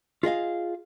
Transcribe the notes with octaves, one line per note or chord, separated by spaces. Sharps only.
F4 G#4 D#5 F5